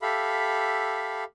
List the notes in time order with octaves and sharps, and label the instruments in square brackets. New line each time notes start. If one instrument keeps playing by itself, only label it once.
[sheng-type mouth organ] G4 A4 E5 F5 B5